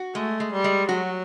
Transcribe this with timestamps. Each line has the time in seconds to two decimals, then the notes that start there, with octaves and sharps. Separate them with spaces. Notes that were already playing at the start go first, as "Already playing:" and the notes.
Already playing: F#4
0.15 G#3 A3
0.40 G#3
0.52 G3
0.64 G#3
0.89 F#3 F#4